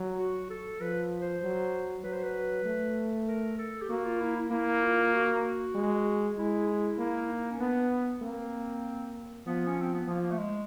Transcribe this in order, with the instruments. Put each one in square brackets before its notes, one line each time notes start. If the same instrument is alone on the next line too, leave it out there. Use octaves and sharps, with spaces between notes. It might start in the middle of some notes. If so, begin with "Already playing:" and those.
Already playing: [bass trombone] F#3
[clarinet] F#4
A4
[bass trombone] F3 [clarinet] B4
[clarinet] C5
[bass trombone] F#3
[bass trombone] F#3 [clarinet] B4
[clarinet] C5
B4
[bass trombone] A3
[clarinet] A#4
A4
G4
[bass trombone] A#3 [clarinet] F#4
[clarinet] F4
E4
E4
[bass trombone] A#3 [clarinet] E4
[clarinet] F4
F#4
[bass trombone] G#3
[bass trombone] G#3 [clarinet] E4
[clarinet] E4
[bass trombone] A#3 [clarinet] E4
[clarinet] D#4
C#4
[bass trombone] B3 [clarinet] D4
[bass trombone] A#3 [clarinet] C4
[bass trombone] F3 [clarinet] B3
[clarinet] C#4
C4
B3
[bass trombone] F3 [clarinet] A#3
[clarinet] A#3
A3
G#3